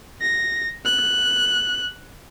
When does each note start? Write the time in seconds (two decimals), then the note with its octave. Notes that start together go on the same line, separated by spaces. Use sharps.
0.21 A#6
0.85 F#6